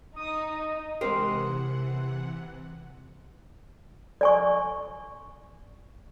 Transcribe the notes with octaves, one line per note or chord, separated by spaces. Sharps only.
D#4 D#6
C3 E3 G#3 C4 G4 A#4 C5 F#5
D5 G#5 C#6